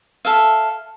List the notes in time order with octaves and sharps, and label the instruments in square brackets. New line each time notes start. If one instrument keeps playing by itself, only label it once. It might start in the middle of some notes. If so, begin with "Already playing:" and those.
[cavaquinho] A4 E5 F5